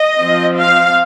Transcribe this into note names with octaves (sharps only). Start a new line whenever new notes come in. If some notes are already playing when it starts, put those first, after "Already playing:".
Already playing: D#5
F3 C4
F5